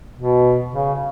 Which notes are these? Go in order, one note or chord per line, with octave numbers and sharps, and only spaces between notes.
B2
C#3